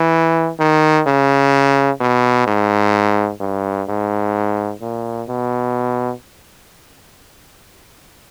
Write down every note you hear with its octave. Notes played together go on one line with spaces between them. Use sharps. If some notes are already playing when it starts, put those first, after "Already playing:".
Already playing: E3
D#3
C#3
B2
G#2
G2
G#2
A#2
B2